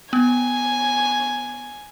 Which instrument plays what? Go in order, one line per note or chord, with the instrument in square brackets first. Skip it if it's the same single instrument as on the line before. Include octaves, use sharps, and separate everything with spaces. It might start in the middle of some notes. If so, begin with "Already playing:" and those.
[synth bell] B3 [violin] G#5